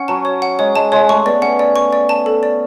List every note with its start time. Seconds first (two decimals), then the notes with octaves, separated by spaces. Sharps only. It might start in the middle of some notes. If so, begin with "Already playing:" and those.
Already playing: C#4 F#5
0.08 F#3 A5
0.25 C#5
0.42 F#5
0.59 G#3 C#5
0.75 G#3 A5
0.92 G#3 C#5
1.09 A3 C#6
1.26 B3 D5
1.41 C#4 F#5
1.59 D5
1.76 C#6
1.93 D5
2.09 A5
2.26 A4
2.43 D5